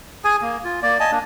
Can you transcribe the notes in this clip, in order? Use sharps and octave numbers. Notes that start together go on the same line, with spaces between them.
G#4 G#5
A#3
F4
A#3 D5
D#5 G#5 A5
A#3 D4